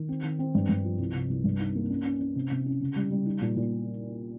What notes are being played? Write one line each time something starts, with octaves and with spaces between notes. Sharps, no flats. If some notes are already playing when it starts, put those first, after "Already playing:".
Already playing: D#3
C4
D#3
C4
G2
G2
F3
C2
C3
C2
G2
D#4
A#3
C#4
C#4
C#4
C3
C3
C#4
C#3
G3
G3
D#4
A#2
A#2